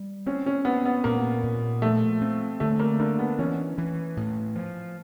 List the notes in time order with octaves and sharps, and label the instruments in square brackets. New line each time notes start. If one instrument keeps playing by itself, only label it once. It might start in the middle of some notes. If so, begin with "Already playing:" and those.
Already playing: [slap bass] G3
[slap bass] C4 [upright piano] C#4
[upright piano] C#4
[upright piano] B3 [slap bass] C4
[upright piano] B3
[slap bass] A#2 [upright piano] A#3
[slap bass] A#2
[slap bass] F3 [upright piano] A3
[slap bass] C4
[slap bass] D3 [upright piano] A3
[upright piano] A#3
[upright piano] A#3 [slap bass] D4
[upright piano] B3
[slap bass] E3 [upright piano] C#4
[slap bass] E3
A2
F3